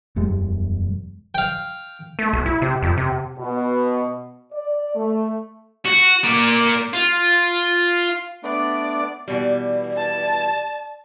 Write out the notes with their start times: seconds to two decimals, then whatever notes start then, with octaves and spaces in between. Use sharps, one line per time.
0.16 E1 F#2 G3 G#3
1.35 F5 G5
2.19 A3
2.33 B1
2.46 E4
2.62 C3
2.83 F2
2.97 C3
3.38 B2
4.52 D5
4.95 A3
5.85 F#4
6.24 A#3 D5
6.94 F4
8.43 A3 B3 D4 D5
9.28 B2 E3 G3 D5
9.96 A5